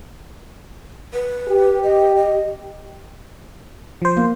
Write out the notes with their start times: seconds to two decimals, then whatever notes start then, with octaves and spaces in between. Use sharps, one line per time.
1.14 B4
1.48 G4
1.84 D#5
2.16 D#5
4.02 F3 C5
4.17 A#3